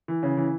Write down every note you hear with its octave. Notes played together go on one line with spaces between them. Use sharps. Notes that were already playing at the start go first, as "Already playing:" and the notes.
E3
C#3
E3